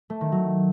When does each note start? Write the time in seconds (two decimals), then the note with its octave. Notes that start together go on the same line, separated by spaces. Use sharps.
0.10 A3
0.21 D#3
0.32 F#3